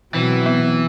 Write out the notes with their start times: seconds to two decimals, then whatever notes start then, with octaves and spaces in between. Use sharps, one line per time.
0.15 B2 E3 F#3 C4
0.46 B3